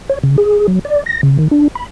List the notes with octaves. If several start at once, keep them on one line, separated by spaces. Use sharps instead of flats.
C#5
C#3
G#4
F#3
D5
A#6
C#3
D#3
D4
B5